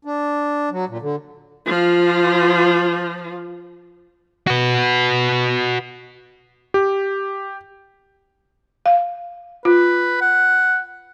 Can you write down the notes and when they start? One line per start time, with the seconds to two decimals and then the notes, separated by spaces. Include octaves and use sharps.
0.05 D4
0.71 F#3
0.89 A#2
1.01 D3
1.66 F3 F4
4.47 F#4 B4
6.74 G4
8.86 F5
9.65 F4 B4
10.21 F#5